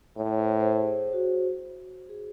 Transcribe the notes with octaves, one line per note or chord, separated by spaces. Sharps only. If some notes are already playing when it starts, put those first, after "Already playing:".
A2 C#5
C5
C5
G#4
F#4
G#4